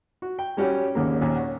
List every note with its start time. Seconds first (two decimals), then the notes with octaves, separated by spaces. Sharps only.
0.22 F#4
0.39 G5
0.57 G3 C#4 F#4 G4
0.95 G#1 D#2 C#3 A#3
1.21 D#2 A#2
1.35 C#5 F#5